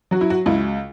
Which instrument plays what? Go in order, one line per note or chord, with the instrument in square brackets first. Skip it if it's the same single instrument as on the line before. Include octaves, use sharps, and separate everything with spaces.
[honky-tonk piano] F#3 F#4
E4
F#4
C#2 E4